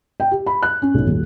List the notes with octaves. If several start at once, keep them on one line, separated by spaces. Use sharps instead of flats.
G5
G4
B5
F#6
C#4
B1
D#1